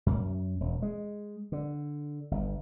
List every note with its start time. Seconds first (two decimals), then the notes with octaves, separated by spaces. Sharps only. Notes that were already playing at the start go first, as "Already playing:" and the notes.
0.06 F#2
0.61 E1
0.82 G#3
1.52 D3
2.31 G1